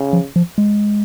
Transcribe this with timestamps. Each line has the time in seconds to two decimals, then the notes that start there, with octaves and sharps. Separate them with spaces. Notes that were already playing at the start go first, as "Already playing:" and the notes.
Already playing: C#3
0.13 F3
0.36 F3
0.58 G#3